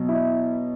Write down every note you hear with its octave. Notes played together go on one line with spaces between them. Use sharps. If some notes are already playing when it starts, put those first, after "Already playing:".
Already playing: B2 F#3
E4